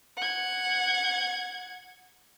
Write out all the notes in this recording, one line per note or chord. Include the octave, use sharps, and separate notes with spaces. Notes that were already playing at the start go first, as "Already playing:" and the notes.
F#5 G#6